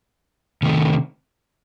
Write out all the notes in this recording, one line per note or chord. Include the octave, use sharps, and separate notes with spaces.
C3 D#3 A3